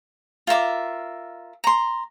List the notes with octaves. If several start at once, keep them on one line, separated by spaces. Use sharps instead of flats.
F4 A#4 E5 D6
A#5 C6